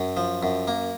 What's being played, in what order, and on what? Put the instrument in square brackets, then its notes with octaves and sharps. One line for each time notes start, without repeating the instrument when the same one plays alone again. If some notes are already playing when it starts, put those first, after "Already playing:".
Already playing: [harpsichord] F#2
F3
F#2
A#3